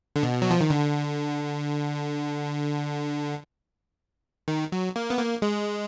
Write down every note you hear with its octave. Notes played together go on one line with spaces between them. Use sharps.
D3
B2
F#3
F3
D#3
D3
D#3
F#3
A#3
B3
A#3
G#3